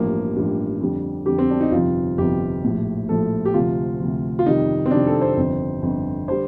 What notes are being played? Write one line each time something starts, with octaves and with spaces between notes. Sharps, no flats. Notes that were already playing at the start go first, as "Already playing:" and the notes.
Already playing: A1 G2 F3 A#3
A1 G2 F3
F2 D3 G3
F2 D3 G3 G4
C4
D4
D#4
G1 F2 C3 F3 F4
G1 F2 C3 F3 G4
A#1 A2 F3
A#1 A2 F3 A4
G4
D2 C3 F3 F4
D2 C3 F3
F4
F2 C3 D#3 G3 D#4
C4
F2 C3 D#3 G3 D4
A4
C5
G1 F2 D3
G1 F2 D3
D3 G3 C5